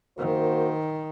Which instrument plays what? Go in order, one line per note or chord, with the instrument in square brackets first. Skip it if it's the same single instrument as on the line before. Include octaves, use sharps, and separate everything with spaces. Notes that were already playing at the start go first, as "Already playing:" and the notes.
[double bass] D#3 [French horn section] A#3 F#4 C5